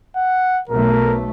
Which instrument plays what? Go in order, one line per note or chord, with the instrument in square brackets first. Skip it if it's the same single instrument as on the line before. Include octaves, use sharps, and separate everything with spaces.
[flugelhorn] F#5
[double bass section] B1 A3 [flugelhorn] A#4